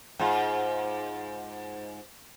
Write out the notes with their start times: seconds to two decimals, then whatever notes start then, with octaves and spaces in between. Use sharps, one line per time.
0.19 G#2 F4